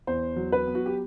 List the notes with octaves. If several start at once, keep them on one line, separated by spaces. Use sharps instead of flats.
E2 C5
F#3
B4
B3
F#4
G4